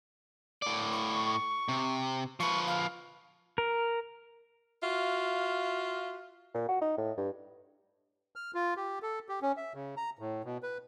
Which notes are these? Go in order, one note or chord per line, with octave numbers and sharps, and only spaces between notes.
A2 D5
C#6
C3
F3 B4 C#6
F5
A#4
F4 F#4 E5 F5
A#2
F#4
D#4
A2
G2
F6
F4
G4
A4
G4
C#4
E5
C#3
A#5
A2
B2
B4